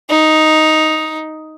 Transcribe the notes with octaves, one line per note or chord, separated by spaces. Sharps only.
D#4